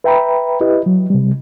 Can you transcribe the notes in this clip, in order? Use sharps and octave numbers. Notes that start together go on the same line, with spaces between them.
B4 E5 G5 A#5 B5
E4 G4 B4 D#5
F#3
C3 G3